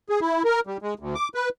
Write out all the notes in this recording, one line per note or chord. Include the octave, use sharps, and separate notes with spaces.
G#4
E4
A#4
G3
G#3
D2
D6
B4